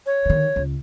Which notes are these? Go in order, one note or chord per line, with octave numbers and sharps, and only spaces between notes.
C#5
D3 D#3
C#2